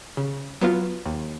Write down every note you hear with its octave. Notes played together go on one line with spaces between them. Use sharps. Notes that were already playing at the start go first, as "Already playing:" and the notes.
C#3
F#3 B3 F4
D#2